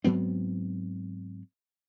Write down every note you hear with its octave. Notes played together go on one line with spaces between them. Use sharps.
G#2 F#3 B3 C4